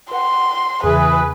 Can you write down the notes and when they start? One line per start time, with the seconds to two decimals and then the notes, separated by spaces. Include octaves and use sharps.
0.11 B4 F#5 G5 C6
0.84 E2 C#3 E3 G#4 B4